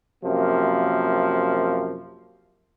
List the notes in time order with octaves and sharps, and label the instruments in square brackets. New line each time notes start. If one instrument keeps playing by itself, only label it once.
[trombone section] F#2 C3 F3 A#3